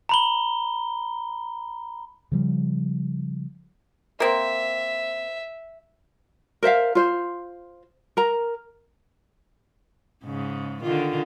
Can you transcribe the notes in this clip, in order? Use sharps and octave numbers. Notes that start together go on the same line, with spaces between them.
A#5 B5 G7
C#3 F3 G3
A#3 C4 E5
A#4 C5 E5 F5
F4 C5
A#4 A#5
G#2 C#3
D3 D#3 F4